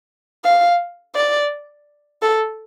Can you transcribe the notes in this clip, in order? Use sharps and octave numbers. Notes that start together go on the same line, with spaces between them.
F5
D5
A4